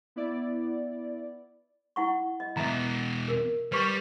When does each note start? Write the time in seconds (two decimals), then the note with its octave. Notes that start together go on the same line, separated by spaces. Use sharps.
0.16 B3 E4 D5
1.96 E4 F#5 C#6
2.40 D#5
2.57 E2 B2 D#5 E5 A#5
3.28 A#4
3.72 G3 B4 D5 C#6